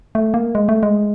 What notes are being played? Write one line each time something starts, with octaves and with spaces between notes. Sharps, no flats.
A3
A#3
G#3
A3
G#3